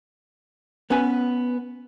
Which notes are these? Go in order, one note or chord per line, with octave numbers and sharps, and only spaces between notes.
B3 C#4 B4 G#5